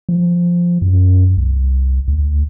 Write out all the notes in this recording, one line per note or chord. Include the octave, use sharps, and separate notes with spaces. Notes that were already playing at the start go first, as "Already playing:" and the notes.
F3
F#2
C2
D2